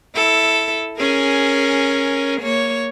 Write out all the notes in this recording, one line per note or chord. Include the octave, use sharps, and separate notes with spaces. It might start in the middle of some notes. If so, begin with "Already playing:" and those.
E4 A4
C#4 G#4 A#4
A#3 C#5